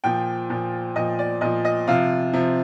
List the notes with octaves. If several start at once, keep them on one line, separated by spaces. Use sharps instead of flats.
A#2 F3 G5
A#2 F3
A#2 F3 D#5
D5
A#2 F3 D#5
D#5
C3 F3 F5
C3 F3